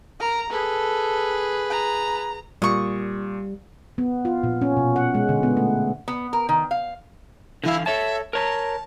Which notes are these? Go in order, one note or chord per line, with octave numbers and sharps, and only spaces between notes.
A#4 A#5
G#4 A4 B4
A#5
A#2 G3 C#6 D#6
B3
F4
A#2
C#4
B2
F#5
G#3
D3
B3
A3
B3
A#4
D#3
F5
D3 E3 E4 F5
A4 C#5 E5 A5
A#4 C#5 A5 A#5